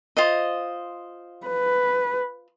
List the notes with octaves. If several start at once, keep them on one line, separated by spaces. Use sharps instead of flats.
F4 C5 D#5
B4